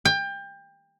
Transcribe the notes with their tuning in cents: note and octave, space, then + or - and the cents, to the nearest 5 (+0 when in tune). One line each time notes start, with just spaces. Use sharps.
G5 +25